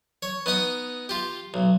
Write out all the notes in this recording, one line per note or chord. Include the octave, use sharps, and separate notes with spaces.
C#5
B3 D#4 D#5 A#5
F4 G4
B1